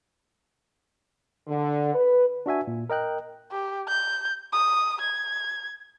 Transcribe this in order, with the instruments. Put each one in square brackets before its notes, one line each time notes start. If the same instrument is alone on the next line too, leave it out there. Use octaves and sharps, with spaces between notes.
[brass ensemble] D3
B4
[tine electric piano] D4 F#4 E5 G#5
A#2
A#4 D#5 G5 F#6
[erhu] G4
G6
D#6
G#6